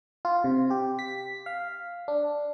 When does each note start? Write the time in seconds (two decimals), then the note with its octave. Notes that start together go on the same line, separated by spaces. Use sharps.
0.25 F4
0.44 C3
0.70 G4
0.99 B6
1.46 F5
2.08 D4